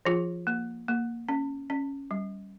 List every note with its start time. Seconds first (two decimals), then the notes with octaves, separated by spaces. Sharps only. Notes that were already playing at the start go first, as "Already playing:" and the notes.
0.05 F3 F4 G#4
0.47 A#3
0.88 A#3
1.29 C#4
1.70 C#4
2.11 G3